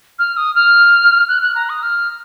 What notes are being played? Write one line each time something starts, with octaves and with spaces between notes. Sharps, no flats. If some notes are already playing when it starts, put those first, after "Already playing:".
F6
D#6
F6
F#6
F#6
A#5
D#6
F6